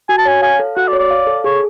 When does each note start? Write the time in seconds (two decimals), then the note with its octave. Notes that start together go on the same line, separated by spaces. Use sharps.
0.09 F#4 G#5
0.18 A5
0.25 C#5 G#5
0.42 F5 G#5
0.59 A4
0.77 F#4 F#5
0.88 D5
0.93 C#5
0.99 D5
1.11 F5
1.27 A4
1.44 G#4 C#5